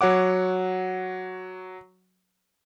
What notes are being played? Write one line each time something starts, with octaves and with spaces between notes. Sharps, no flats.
F#3 C#5 F#5 D6